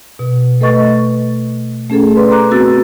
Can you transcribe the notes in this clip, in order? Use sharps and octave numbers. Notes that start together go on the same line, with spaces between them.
B2
A3 A4 B4 D#5 C#6 A6
A3 C#4 G#4 A4
B4 D5 C6
A4 A#5 D6 F#6
B3 C4 F#4 E6 A6